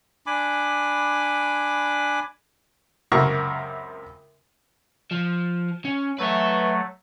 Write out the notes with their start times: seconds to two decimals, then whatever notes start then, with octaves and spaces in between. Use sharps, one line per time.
0.26 D4 G#5 B5 D6
3.12 C#2 F#2 C3 F#4 A#4 C#6
5.11 F3
5.85 C#4
6.19 F#3 A3 B4 E5